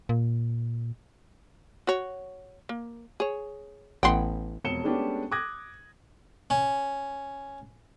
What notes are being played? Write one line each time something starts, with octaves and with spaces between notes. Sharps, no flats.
A#2
F#4 C#5
A#3
G#4 C#5
A1 B3 F#5 G5 C6
E1 F2 C#7 E7 G7
G#3 A3 B3 C#4 D4 G4
D6 D#6 F#6 G#6 A#6
C#4